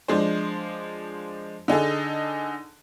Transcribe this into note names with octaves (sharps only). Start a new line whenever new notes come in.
F3 G#3 D4 C5
D3 D#4 G#4 A4